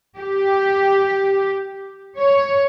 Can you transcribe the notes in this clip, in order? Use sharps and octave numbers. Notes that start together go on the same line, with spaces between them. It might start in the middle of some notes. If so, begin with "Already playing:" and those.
G4
C#5